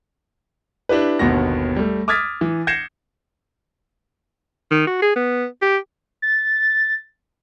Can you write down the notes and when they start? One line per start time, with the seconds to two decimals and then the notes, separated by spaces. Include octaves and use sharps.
0.89 D4 E4 G4 B4
1.19 G1 D#2 B2 B3 A#6
1.76 G3 A3
2.08 D6 D#6 F6 G#6 A6 B6
2.41 E3
2.67 G6 G#6 A#6 C7 C#7 E7
4.71 D#3
4.87 F#4
5.02 G#4
5.16 B3
5.62 G4
6.22 A6